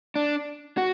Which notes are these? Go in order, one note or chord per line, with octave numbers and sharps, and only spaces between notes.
D4
F#4